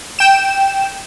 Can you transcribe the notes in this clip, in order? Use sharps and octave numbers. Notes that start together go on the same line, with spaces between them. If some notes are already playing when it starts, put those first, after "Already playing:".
G5 E7